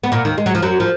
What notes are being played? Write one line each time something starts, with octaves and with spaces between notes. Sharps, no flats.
B3
A#2 A#3
D#2 D#3
G#3
F#3
F3
F#2 F#3
F3